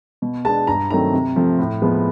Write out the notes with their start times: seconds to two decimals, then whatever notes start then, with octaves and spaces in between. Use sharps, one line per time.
0.22 B2
0.45 G#3 B3 D4 A5
0.67 G2 A#5
0.90 D#3 F#3 A3 C4 A#5
1.13 C3
1.36 F3 A3 C4
1.59 A2
1.82 F3 G#3 B3